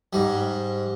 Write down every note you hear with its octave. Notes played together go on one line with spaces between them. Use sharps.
G#2 G3